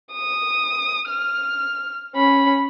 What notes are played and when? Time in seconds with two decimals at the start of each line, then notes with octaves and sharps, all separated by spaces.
0.12 D#6
1.10 F6
2.15 C#4 B5